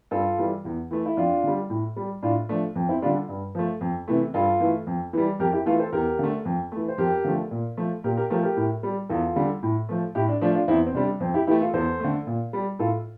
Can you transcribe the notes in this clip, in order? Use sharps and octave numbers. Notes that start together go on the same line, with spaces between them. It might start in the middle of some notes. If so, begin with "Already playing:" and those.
G2 F4 A4
E3 G3
E2
E3 A3
E4
F2 D4 F4
D3 G3
A2
G3
A2 D4 F4
F3 A3 D4
F2
C4 E4
D3 G3 D4 F4
G2
F3 A3
F2
C3 E3 A3
G2 F4 A4
E3 A3
F2
E3 G3
F2 G4 A#4
E4 G4
E3 A3 F4 A4
A4 C5
E2 G4 A#4
D3 A3
F2
E3 A3
C5
F2 G4 A#4
D3 F3 A3
A#2
F3 A3
A#2 G4 A#4
G4 A#4
F3 A3 G4 A#4
G4 A#4
A2
G3
E2 F4 A4
D3 G3
A2
F3 A3
A2 E4 G4
D4
F3 A3 D4 F4
D4 F4
E2 C4 E4
C4
C3 G3 D4
F2 C4
E4 G4
E3 A3 E4 G4
F4 A4
E2 A4 C5
D3 A3
A#2
G3
A2 F4 A4